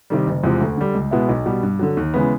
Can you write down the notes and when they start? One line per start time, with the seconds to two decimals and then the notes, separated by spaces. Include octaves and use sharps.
0.10 C3 D#3 G3
0.27 F#1
0.43 E2 C3 F3 G#3
0.61 D2
0.78 D3 G3
0.94 C#2
1.11 B2 G#3 B3 E4
1.29 B1
1.46 B2 G3
1.63 G2
1.79 D3 F#3
1.97 D#2
2.14 C#3 E3 G#3 B3